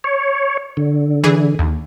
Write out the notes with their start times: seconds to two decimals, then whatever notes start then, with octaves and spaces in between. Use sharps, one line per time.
0.04 C#5
0.77 D3
1.24 E3 G#4
1.59 D#2